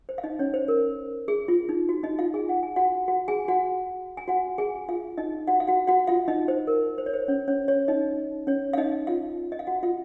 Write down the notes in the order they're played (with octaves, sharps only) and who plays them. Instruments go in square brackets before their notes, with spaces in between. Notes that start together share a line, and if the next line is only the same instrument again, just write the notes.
[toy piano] C5
F5
D#4 D#5
C#4 C#5
C5
A#4
G#4
F4
D#4
F#4
D#4 D#5
F4 F5
G#4 G#5
F#5
G#5
F#4 F#5
F#4 F#5
G#4 G#5
F#4 F#5
G#5
F#4 F#5
G#4 G#5
F4 F5
D#4 D#5
F#4 F#5
F5
F#4 F#5
F#4 F#5
F4 F5
D#4 D#5
C5
A#4
C5
C#5
C5
C#4 C#5
C#4 C#5
C#4 C#5
D#4 D#5
C#4 C#5
F5
D#4 D#5
F4 F5
D#5
F5
F#4 F#5
F4 F5